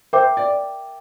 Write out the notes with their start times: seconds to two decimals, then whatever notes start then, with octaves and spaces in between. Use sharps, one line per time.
0.13 A#4 C5 E5 G5 D6
0.37 D5